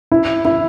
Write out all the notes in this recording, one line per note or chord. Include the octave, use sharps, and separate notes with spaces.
E4
E4